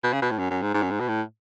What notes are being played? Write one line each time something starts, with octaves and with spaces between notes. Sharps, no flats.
B2
C#3
B2
A2
F#2
F#2
G#2
G#2
F#2
G#2
B2
A2